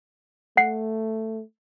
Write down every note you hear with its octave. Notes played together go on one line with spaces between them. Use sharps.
A3 F#5 C7